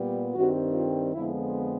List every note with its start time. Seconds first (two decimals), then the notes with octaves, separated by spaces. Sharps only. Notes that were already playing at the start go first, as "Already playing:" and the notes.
Already playing: A#2 G3 B3
0.35 G2 D#3 G3 C4 F#4
0.74 F4
1.14 F2 D3 F3 G#3 B3 E4